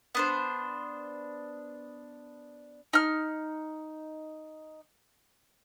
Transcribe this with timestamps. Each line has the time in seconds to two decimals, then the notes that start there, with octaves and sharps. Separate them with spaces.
0.15 B3 D4 C5
2.93 D#4 F6